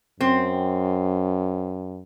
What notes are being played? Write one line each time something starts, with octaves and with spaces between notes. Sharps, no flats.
F#2 C4